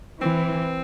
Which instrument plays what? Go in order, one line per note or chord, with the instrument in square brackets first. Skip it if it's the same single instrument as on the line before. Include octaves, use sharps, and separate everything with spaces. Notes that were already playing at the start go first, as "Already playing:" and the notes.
[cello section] E3 [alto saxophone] C4